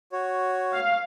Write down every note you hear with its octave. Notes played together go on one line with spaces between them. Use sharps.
F#4 C#5
F5